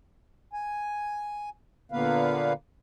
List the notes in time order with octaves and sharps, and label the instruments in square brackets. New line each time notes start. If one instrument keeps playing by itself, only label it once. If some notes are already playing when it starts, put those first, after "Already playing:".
[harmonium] G#5
A#2 D3 A#3 B3 B4 F5